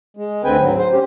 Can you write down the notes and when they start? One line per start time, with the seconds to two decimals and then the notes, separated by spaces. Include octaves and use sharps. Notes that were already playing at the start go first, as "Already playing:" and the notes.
0.17 G#3
0.44 D2 D3 C4 B4 G5 G#5
0.59 G#2 F#3
0.78 C5
0.92 C#4 G4